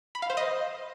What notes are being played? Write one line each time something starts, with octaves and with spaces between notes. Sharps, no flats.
B5
F5
C5
D#5